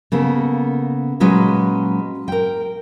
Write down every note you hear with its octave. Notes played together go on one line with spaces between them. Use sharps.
C#3 A#3 B3 A4
A#2 F#3 G#3 C#4 B4
A#4 G5